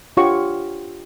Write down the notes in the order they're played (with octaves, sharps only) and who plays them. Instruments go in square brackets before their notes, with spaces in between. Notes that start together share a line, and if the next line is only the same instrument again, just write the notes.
[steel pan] D4 F4 G4 C#5 F#5 C#6